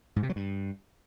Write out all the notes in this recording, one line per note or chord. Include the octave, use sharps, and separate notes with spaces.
G#2
C3
F#3
G2